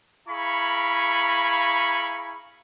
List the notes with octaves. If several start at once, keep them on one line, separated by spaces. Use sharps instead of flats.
E4 G#4 F5 A#5 B5 C#6